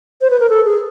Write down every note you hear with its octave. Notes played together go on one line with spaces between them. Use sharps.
C5
B4
A#4
A4
G#4